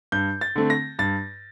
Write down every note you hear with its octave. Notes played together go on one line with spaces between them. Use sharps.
G2 G6
A6
D3 A3 C4
A#6
G2 A6